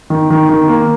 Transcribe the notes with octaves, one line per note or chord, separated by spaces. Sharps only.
D#3
D#3
D#3
A#3